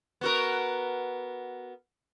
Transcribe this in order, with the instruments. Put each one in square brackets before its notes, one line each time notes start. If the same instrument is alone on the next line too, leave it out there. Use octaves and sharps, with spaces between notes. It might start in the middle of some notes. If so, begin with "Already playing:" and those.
[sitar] B3 F#4 A#4